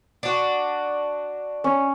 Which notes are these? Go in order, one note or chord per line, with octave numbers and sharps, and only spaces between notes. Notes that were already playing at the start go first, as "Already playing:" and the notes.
D4 F#4
C#4